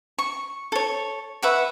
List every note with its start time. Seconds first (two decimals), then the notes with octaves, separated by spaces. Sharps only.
0.18 C#6
0.72 A4 C#5
1.43 B4 E5 F#5 C#6